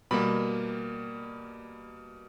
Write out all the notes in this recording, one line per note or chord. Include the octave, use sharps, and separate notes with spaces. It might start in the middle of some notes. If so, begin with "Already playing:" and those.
B2 G3 A#3 B5